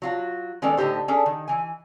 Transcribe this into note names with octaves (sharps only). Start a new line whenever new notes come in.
F#3 F4 F#4
D#3 G#3 B3 C#4 A4 D5
A2 D3 D#4 G4 C5
C#4 D4 G#4 A4
D#3
E3 G#5